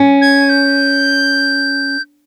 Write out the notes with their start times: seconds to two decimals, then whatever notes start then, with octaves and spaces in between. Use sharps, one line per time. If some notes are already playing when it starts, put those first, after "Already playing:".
Already playing: C#4
0.21 G#6
0.49 G6